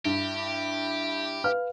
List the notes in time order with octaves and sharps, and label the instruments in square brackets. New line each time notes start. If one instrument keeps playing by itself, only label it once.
[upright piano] G2 [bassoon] E4 [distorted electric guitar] G4
[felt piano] B4 F5 F6